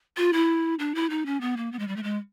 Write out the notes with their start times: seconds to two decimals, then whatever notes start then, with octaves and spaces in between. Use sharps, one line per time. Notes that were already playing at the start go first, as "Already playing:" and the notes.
0.17 F4
0.33 E4
0.79 D4
0.95 E4
1.10 D#4
1.26 C#4
1.41 B3
1.57 A#3
1.72 B3
1.79 G#3
1.88 G3
1.96 A3
2.03 G#3